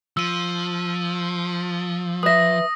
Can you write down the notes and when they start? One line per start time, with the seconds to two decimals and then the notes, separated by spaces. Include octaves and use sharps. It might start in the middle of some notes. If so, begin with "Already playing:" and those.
0.17 F3 E6 D#7
2.23 B4 E5 D#6 A#6